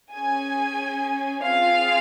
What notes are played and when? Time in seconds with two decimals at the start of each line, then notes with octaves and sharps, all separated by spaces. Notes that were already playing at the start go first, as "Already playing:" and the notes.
0.12 C#4 G#4 G#5
1.43 C4 F4 G#4 F5